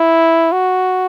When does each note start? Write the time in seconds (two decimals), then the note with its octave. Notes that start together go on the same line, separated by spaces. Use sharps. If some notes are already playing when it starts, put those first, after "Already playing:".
Already playing: E4
0.52 F#4